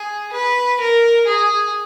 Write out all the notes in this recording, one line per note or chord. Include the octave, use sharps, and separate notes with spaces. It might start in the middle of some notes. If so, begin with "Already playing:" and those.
Already playing: G#4
B4
A#4
G#4